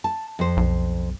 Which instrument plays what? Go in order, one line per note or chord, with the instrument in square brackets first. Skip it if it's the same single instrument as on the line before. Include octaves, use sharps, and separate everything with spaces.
[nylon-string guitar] A5
F2 C5
[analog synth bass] B1